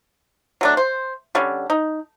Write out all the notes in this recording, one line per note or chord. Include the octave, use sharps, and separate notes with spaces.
F#3 A3 D4
C5
D3 G3 C#4
D#4